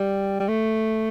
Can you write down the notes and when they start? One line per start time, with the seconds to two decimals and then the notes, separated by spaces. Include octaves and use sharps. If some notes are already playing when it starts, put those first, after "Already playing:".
Already playing: G3
0.40 G3
0.48 A3